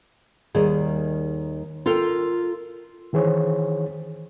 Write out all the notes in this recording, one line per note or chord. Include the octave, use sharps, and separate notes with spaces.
D#2 D#3 G3 G#4
F4 A4 A#4 G5
D#3 E3 G#4 C5 C#5